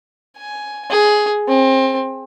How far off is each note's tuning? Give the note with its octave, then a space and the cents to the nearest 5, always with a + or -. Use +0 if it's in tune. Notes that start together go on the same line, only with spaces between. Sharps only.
G#5 +10
G#4 +10
C4 +25